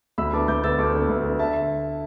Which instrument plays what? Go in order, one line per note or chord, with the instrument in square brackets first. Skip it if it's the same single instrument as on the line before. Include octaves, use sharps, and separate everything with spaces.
[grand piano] D2 B5 E6
D3 B3 A5 D6
D2 D6 G6
D3 B3 E6 A6
D2 A5 D6
D3 B3
D2
D3 B3
D3 E5 A5
E5